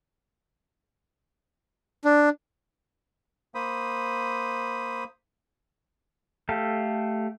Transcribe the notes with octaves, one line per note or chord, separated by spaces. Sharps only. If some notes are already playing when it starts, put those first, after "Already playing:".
D4
A#3 C5 B5 D#6
A3 G4 A4 F5